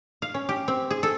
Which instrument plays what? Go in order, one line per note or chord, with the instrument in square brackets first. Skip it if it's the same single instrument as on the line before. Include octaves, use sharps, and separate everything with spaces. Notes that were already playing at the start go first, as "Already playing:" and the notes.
[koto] F5
C#4
G4
C4
G#4
A4